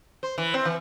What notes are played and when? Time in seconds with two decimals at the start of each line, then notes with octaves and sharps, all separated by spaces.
0.23 C5
0.38 E3
0.54 C4
0.65 E3